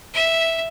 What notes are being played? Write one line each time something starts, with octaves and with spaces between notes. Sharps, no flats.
E5